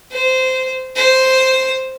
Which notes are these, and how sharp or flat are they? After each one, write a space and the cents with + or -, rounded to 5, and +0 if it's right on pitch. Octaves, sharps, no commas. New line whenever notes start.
C5 -15
C5 +0